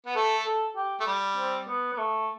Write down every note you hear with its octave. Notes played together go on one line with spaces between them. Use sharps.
B3
A3 A4
A4
G4
A3
G3
C4
B3
B3
A3